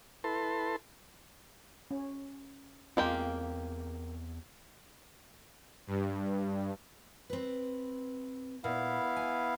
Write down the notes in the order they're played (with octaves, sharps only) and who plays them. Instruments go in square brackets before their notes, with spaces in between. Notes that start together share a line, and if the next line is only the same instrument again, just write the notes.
[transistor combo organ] E4 A4 B4 A5 C6
[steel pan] C#4
[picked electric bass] E2 C4 [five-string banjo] G#3 A#3 G4 [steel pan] F4
[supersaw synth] G2
[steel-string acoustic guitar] C4 B4
[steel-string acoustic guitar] A#2 [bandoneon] B3 E4 F5
[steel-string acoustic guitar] G#5